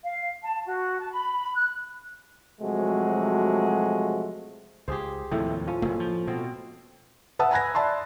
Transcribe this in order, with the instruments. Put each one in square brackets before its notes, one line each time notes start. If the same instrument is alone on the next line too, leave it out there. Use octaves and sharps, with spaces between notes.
[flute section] F5
A5
F#4
A5
B5
F#6
[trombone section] C3 F3 F#3 G#3 A3 F#4
[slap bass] C#2 [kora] G4 G#4 C5
[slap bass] D#2 C3 F3 [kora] A2 [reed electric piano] E5 G5
[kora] C#4 [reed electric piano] F4 A4 C5
[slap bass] F#1 [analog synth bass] A#3
[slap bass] F3
[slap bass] B2 [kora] C4
[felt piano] B4 E5 F#5 A5 D#6 E6
G#5 A#5 B5 F#6 G#6 A#6
D5 E5 A5 B5 C6